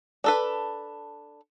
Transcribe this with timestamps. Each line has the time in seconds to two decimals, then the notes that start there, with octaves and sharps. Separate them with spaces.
0.24 D4 A4 B4